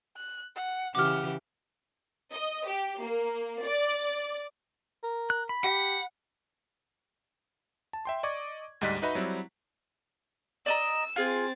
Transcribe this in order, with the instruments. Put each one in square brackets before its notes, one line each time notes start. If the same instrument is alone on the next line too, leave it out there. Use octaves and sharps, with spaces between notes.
[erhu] F#6
F#5
[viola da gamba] C#3 E3 G4 [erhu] F#5 [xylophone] D6 F6
[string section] D#5
G4
A#3
D5
[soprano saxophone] A#4
[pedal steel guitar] F#6
B5
[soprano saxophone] G4 [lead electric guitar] F#5
[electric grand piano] A5
E5 G5 C6
D5 D#5 C#6 D6 G#6
D2 G#2 G3 D#5 F#6 B6
D#4 F#4 B4 D#5 E5 B5
F#3 G3 C4 E4
[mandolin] D5 D#5 A#5 [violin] E6
[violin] C4 A6 [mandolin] F4 G#4